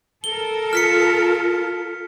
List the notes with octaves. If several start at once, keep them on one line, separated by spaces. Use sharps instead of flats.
A4 A#4 G7
F4 F6 B6 C#7